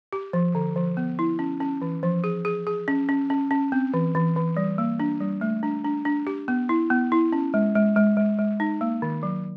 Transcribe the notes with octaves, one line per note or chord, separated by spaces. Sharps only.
G4
F3
D3
F3
B3
E4
C#4
C#4
E3
F3
G#4
G#4
G#4
C#4
C#4
C#4
C#4
C4
E3
E3
E3
G3
A#3
D4
G3
A3
D4
D4
D4
G4
B3
E4
B3
E4
C#4
G#3
G#3
G#3
G#3
G#3
D#4
A#3
D#3
F#3